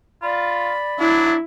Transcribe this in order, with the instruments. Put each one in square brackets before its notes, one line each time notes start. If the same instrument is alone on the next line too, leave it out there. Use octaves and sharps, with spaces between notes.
[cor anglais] F4 [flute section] D5 B5
[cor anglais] F#3 [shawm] D4 [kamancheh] E4